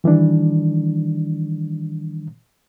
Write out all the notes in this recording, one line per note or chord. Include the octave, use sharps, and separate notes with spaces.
D#3 E3 G3 D4